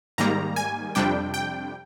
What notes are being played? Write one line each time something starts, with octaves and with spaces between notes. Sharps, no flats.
G#2 D#3 G3 A#3 A#5
G#5
F2 C3 G3 D4 G5
G5